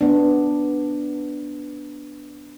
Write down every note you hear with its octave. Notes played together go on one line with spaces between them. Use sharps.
B3 D4